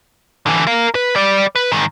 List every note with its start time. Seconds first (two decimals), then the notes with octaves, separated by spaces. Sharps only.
0.46 D3 E3
0.67 A#4 F5
0.95 B4
1.16 G3 D5
1.55 B4
1.72 G#2 D#3